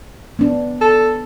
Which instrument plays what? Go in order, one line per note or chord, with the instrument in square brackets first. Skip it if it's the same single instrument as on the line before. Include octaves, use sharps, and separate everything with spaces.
[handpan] B3 D4
[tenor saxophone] A4